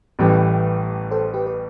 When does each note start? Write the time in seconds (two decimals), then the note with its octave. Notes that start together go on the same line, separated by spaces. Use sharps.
0.19 A1 A2 E3 G3 G4 B4
1.11 A4 C5
1.34 G4 B4
1.46 B4